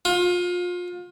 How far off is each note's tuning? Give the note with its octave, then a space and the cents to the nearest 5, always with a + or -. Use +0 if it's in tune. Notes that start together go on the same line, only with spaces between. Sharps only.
F4 +30